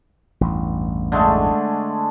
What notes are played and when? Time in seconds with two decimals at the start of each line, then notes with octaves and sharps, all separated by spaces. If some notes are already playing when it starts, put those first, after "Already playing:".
0.41 A1 E2 G2
1.12 D3 G#3 A3